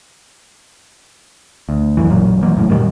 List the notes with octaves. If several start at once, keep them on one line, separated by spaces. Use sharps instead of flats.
D2
C#2 F#2 E3
A1 F#2 A#2
E3 F#3 A#3
E1 C#2 F#2 A2
F#2 A#2 D#3 G3